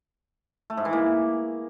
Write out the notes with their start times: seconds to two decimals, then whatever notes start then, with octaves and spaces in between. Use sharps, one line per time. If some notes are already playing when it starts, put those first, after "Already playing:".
0.70 A3
0.77 G#2
0.85 E3
0.93 A#3